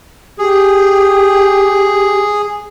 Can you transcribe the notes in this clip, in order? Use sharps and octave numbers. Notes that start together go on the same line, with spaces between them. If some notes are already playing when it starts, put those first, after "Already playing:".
G4 G#4